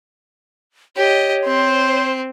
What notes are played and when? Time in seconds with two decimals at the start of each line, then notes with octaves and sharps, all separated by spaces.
0.96 G4 C#5 D#5
1.46 C4 C5